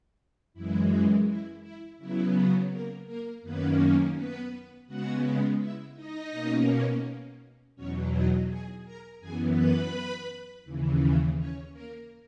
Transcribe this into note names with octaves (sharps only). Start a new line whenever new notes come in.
F#2 E3 G#3 E4
E4
E4
C#3 F#3 B3 E4
A#3 A#4
A#3 A#4
F#2 D#3 A#3 B3 C#4 B4
B3 B4
C#3 G#3 B3 F#4 F#5
E4 E5
D#4 D#5
B2 A#3 C#4
E2 B2 F#3 C#4 C#5
D#4 D#5
G#4 G#5
A#4 A#5
F#2 E3 B3 G#4 G#5
B4 B5
D#2 C#3 E3
C#4 C#5
A#3 A#4